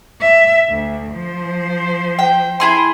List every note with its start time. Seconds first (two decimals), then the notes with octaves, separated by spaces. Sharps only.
0.21 E5
0.69 D2
1.12 F3 C5
2.19 G5
2.60 E4 G#4 C6